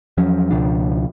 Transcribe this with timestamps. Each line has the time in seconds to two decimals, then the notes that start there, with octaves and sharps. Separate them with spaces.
0.17 E2 F3 F#3 C#4
0.51 C#2 B2 F3 D4